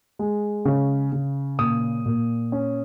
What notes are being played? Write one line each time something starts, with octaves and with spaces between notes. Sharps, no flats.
G#3
C#3
C#3
A#2 D#6
A#2
C#4